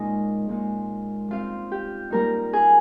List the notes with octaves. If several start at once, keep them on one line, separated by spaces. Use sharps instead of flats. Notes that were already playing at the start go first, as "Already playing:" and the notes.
Already playing: A#2 G#3 C#4 D#4 F4 D#5
A#2 G#3 D#4
G3 C4 D#4 F4 F5
G4 G5
G3 A#3 D#4 A#4 A#5
G#4 G#5